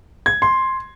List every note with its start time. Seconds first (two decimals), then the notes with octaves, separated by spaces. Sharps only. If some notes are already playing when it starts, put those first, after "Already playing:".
0.26 G#6
0.42 C6